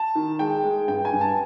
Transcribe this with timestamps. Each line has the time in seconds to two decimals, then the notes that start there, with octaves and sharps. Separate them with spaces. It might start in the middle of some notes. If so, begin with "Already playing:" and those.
Already playing: A5
0.15 D#3
0.39 G#3 G5
0.64 G#3
0.88 G2 G5
1.05 G#5
1.13 G2
1.21 A5